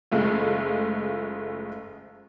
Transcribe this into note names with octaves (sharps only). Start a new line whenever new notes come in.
F#1 G#3 A3 F4